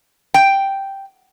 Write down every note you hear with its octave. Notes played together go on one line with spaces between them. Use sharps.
G5